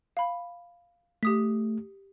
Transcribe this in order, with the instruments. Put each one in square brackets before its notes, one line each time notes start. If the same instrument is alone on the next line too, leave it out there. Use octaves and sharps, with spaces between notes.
[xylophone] F5 B5
[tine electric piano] A3 [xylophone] G4 D#6 B6